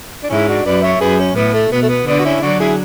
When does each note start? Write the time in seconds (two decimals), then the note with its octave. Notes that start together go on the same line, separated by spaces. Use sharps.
0.24 D4
0.30 G#2 C#4 E4
0.48 D4 F#4
0.66 F#2 B4 D5
0.83 C#5 E5
1.00 F#2 G#4 B4
1.19 C#4
1.36 A2 B3
1.54 A3
1.71 B2 B3
1.82 A3
1.89 B3
2.07 D3 B3 D4
2.19 F#4
2.24 C#4 E4
2.42 D3 F#3 D4 F#4
2.60 E4 G#4